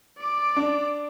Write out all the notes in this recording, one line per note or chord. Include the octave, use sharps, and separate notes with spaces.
D5 D6
D4